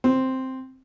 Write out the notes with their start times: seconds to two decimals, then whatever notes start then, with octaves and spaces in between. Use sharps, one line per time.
0.04 C4